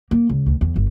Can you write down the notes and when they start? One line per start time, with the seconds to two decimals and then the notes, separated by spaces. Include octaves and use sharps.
0.11 A#3
0.29 C#2
0.46 D2
0.61 E2
0.76 G1